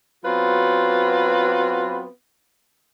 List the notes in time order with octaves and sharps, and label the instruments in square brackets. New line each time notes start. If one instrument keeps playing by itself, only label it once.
[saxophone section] F#3 B3 C4 F4 F#4 B4